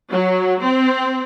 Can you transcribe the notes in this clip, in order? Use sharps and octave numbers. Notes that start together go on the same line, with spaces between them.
F#3
C4